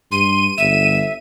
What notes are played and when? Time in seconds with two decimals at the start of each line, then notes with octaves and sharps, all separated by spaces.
0.11 G2 C6 D#7
0.58 G1 E5 E7